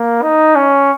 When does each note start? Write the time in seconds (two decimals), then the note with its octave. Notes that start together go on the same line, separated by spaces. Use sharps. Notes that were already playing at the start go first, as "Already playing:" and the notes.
Already playing: A#3
0.22 D#4
0.55 C#4